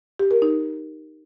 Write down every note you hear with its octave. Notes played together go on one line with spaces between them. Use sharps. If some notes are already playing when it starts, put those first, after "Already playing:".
G4
A#4
D#4